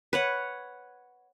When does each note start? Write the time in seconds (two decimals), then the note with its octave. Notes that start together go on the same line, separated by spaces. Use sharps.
0.13 B4 C#5 F#5